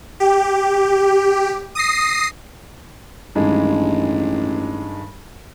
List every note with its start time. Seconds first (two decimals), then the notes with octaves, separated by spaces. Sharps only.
0.20 G4
1.75 D#6 A#6 C7
3.35 A1 G2 D#3 G#3